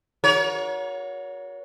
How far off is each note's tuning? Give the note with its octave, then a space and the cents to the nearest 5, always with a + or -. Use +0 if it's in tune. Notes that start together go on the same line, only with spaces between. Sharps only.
F#4 -25 A#4 +30 C#5 +25